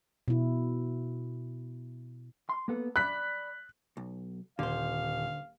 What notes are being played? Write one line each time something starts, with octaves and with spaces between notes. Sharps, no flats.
B2 E4
C6
A#3 B3 A4
D5 B5 F#6 B6
B1
D#1 D3 C5 F5